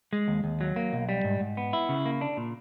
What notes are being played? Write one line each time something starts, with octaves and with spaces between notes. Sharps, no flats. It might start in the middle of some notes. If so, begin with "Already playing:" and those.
G#3
D#2
D#2
F#3
A#3
B1
G3
G#2
G#2
B3
E4
C#3
A#3
D4
A#2